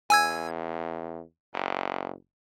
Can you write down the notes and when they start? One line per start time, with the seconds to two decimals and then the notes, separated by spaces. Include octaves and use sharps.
0.10 E2 G#5 E6 G#6
1.54 F#1